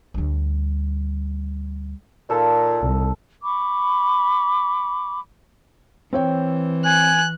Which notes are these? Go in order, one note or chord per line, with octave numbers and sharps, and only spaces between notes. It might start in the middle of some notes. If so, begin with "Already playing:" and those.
D2 G3
A#2 D#4 A4 A5
C2
B5 C#6 D6
E3 C4 C#5 G5
G#5 F#6